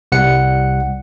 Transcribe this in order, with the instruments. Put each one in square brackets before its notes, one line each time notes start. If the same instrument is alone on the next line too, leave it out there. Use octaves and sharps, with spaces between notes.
[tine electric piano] C2 G3 F#5 C#7